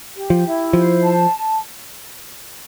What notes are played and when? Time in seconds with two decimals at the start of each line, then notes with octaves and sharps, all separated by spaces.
0.16 G4
0.30 F3
0.45 E4
0.73 F3 C5
1.03 A5